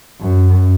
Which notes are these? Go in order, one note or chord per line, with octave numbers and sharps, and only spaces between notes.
F#2